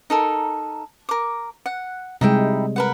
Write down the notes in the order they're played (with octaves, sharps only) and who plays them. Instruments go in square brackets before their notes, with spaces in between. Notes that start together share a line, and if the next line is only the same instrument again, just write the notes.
[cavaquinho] D#4 A4 A#4
A#4 D6
F#5
[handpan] C3 G3 G#3 [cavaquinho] D#4 E4 G5
[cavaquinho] A#4 B4 F#5